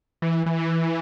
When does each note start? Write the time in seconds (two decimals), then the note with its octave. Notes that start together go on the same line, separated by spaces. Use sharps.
0.22 E3
0.46 E3